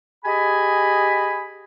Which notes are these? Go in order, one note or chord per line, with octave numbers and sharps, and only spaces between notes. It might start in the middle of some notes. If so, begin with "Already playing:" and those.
G4 G#4 D#5 G#5 B5